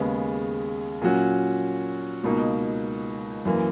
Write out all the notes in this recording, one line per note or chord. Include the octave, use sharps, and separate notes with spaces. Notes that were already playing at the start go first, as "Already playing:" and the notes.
Already playing: D#2 C#3 G#3 B3
A#2 F#3 C#4 F#4
C#2 B2 A#3 D#4
F#2 E3 A#3